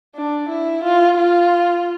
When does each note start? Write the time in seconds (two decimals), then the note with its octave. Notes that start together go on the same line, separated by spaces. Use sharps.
0.16 D4
0.49 E4
0.83 F4
1.17 F4